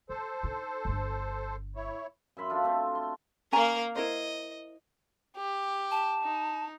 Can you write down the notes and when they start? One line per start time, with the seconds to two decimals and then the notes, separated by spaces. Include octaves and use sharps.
0.09 F3 A4 C5
0.43 D4 D#4
0.85 G1 D4
1.76 E4 C#5
2.37 F#2 E5 B5 C6
2.50 D4 F4 A4
2.64 A3 C4
2.95 C6
3.52 A#3 C#4 A#4 G#5 A#5
3.96 E4 A#4 C5 D#5
5.36 G4
5.91 A5
6.22 D#4